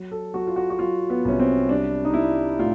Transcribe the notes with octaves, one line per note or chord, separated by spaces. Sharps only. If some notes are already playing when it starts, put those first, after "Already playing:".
Already playing: F#3
A4
F#3 F#4
F4
F#4
F#4
F#3 F4
B3
C2 C#4
C4
G3 D4
D#4
G3 E4
A2 F4